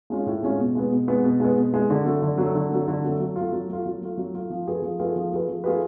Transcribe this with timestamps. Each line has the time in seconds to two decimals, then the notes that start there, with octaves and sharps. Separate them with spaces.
0.10 G#3 C#4 F4
0.26 A2
0.43 G#3 C#4 F4
0.59 B2
0.75 G#3 B3
0.91 B2
1.08 G#3 B3
1.24 B2
1.40 G#3 B3
1.56 B2
1.72 G#3 B3
1.90 D3
2.06 F#3 A3
2.22 D3
2.38 F#3 A3
2.55 D3
2.71 F#3 A3
2.88 D3
3.03 F#3 A3
3.20 F#3
3.36 A3 F4
3.52 F#3
3.69 A3 F4
3.86 F#3
4.01 A3 F4
4.18 F#3
4.34 A3 F4
4.50 F3
4.67 A3 F4 G#4 B4
4.82 F3
4.99 A3 F4 G#4 B4
5.16 F3
5.31 A3 F4 G#4 B4
5.48 F3
5.64 A3 F4 G#4 B4